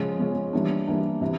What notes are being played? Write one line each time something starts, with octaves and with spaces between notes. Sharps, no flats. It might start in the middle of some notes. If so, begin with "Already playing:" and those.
Already playing: C#3 F3 G#3 C#4
C#3 F3 G#3 C#4
E3 G3 A#3 D4
E3 G3 A#3 D4
C3 E3